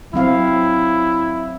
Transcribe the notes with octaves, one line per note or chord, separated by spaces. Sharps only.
F#3 C4 E4 F5